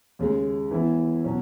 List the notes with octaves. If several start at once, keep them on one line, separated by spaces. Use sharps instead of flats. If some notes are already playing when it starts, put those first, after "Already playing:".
D#2 C#3 G#3
E3 B3 E4
B2 F#3 C#4